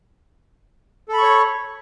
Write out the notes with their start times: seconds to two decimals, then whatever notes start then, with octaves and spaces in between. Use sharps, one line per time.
1.09 A4
1.13 B5
1.18 C#6
1.23 C#5